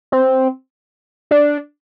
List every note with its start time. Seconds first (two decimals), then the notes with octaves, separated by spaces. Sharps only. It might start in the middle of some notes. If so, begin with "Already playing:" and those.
0.12 C4
1.31 D4